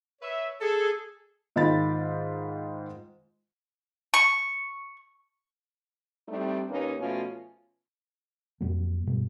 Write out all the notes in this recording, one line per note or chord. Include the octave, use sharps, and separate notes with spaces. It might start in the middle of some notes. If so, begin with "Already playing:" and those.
B4 C#5 E5
G#4 A4
G#2 D#3 F4 B5 A6
C#6
G3 A3 C4 D4 D#4
D#2 A#3 C#4 D#4 B4
B2 F3 A3 C#4 F4
F2 A#2 F#3 A#3
G2 B2 G#3